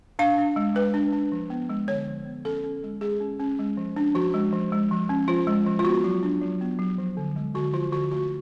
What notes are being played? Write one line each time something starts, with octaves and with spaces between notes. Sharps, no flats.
D4 F5
D4
G#3
G#3 B4
D4
D4
F3
B3
G#3
D3 C#5
F3
B3
C#4 A4
C#4
G#3
G#3 G#4
C#4
C#4
G#3
F3
D4
F3 F#4
G#3
F3
G#3
F3
C#4
F3 F4
G#3
F3
F4
B3 F#4
F#3
D4
F#3
B3
F#3
F3
D3
G#3
D3 F#4
F3 F4
D3 F#4
A3 F#4